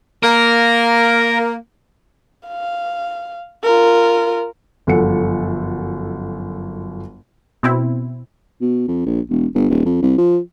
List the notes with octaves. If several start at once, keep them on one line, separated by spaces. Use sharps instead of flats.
A#3 A#4
F5
F4 A#4
G1 F#2 F3 A4 F#5 C#7
B2 C4 E4
B2
F2
A#1
E1
G1
D#1
F2
C2
F3